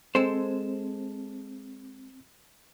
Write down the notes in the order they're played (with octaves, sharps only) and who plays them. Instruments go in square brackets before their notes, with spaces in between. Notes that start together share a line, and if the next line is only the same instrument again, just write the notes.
[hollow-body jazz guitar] G#3 A4 C5 [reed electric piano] C4